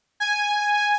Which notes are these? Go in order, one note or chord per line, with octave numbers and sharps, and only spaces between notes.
G#5